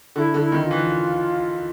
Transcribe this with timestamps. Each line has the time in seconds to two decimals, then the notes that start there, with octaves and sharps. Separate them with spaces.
0.16 D3 E4
0.34 D3
0.40 E4
0.52 D#3
0.64 F4
0.71 E3